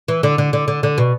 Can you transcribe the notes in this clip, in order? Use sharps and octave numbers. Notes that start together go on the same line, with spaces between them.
E3
D3
D3
D3
D3
D3
B2